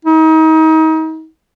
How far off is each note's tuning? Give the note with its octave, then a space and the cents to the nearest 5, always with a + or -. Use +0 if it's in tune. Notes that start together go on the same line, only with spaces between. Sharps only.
D#4 +35